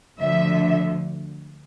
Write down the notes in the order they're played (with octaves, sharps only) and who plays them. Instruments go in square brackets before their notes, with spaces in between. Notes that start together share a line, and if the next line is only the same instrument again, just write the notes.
[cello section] D2 D3 F3 E5